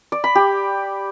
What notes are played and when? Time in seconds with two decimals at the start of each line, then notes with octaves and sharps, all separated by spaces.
0.12 D5
0.24 B5
0.35 G4